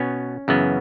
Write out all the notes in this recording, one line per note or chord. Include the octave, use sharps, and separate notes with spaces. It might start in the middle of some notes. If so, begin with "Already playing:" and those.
Already playing: B2 B3 C#4
F#2 C#3 E3 B3